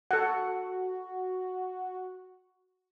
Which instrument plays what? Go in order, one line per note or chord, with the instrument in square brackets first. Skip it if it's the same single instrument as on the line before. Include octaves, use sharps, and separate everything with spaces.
[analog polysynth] F#4 [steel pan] A4 F#5